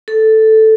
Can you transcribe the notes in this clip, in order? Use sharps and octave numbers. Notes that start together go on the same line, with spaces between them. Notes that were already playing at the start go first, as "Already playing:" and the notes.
A4